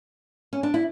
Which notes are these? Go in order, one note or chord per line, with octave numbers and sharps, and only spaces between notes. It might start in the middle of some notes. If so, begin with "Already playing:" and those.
C#4
D4
E4